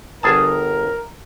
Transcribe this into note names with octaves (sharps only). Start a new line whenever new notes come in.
G1 G#4 A#4 A5